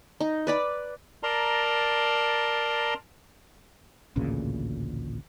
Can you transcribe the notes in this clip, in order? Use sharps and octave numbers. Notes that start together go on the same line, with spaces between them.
D#4
B4 D5 B5
A#4 D5 A5 A#5 C6
A1 D2 A#2 C#3